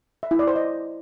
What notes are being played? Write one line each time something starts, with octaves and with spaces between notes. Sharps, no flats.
E5
E4
D5
C5
D#5